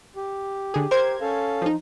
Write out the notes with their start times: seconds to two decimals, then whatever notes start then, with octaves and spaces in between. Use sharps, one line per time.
0.16 G4
0.74 D3 G#4
0.91 A#4 C5 G#6
1.21 C#4 A4 F5
1.62 F3 D#4